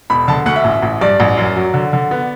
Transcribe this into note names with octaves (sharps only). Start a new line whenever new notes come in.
E1 B5
D3 A5
D2 F#5
E5
A1
A1
G2 D5
A1
F#2
F#3
D3
D3
B3